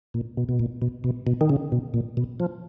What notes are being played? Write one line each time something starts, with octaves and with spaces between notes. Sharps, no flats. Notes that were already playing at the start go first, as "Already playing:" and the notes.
A#2
B2
B2
A#2
B2
B2
B2
D#3
C#3
B2
A#2
B2
F3